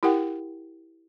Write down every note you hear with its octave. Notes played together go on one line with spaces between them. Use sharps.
E4 G4 A#4 F#5 G5